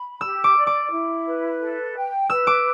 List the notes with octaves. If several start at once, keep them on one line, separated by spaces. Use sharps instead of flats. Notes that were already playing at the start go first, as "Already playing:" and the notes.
Already playing: B5
G4 E6
D6
D5
D6
E4
B4
A4
G5
B4 E6
D6